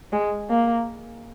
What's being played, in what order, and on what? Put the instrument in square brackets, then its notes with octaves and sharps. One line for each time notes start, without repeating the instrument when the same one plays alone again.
[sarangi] G#3
A#3